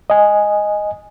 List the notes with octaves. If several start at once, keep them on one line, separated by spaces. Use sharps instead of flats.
D#5 G#5